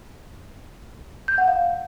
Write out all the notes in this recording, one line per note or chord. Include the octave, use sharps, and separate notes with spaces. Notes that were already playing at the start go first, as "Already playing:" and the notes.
G6
F#5
F5